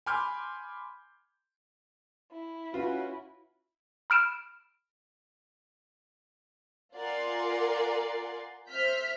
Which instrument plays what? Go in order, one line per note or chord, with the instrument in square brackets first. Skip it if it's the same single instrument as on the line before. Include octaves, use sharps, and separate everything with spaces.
[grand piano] G#5 B5 C6 D6 F6 G6
[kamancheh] E4
[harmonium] C#4 F#4 B4 [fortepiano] F4
[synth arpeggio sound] B5 F6 D7 E7
[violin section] F4 A#4 D5 F#5 G#5 C6
C5 E5 F6 G6 B6